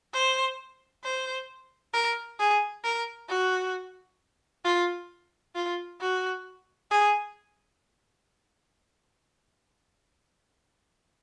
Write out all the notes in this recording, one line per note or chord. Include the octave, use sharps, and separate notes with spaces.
C5
C5
A#4
G#4
A#4
F#4
F4
F4
F#4
G#4